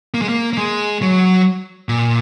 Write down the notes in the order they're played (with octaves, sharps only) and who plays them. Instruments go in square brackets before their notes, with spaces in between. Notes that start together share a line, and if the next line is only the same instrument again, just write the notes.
[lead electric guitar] A#3
G#3
A#3
A#3
G#3
F#3
A#2